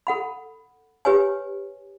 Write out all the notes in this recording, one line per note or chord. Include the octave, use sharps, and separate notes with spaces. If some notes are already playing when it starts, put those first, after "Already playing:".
A4 F#5 B5
G4 B4 C#5 G#5